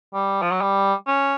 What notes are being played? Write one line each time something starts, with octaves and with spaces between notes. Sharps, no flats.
G3
F3
F#3
G3
C#4